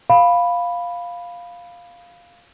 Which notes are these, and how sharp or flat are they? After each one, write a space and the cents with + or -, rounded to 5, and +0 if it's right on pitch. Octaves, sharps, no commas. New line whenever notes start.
F5 +5 B5 +0